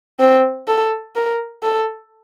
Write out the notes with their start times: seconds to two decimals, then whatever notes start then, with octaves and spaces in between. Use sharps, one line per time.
0.19 C4
0.68 A4
1.15 A#4
1.63 A4